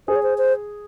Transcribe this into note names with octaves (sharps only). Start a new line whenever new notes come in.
G#4 C5
C#5
C5
C5